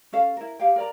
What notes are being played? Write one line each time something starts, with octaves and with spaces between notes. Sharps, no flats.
C#4 A4 F5
E4 A#4
G4 F5 G5
A#4 D5 A#5